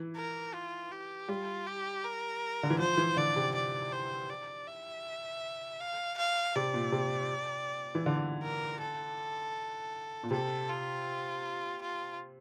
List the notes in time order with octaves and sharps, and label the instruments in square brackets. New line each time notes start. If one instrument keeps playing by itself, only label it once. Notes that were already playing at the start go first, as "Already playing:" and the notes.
Already playing: [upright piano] E3
[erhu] A#4
F4
G4
[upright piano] G3 [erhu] F4
[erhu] G4
A#4
[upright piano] D3
E3
[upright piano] F3 [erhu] C5
[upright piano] E3
[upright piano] D3 [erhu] D5
[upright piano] C3
[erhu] D5
C5
D5
E5
F5
F5
[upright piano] C3 [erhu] D5
[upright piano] A#2
C3
E3
D3
[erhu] A#4
A4
[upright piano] A#2
[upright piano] C3 [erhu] A4
[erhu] F4
F4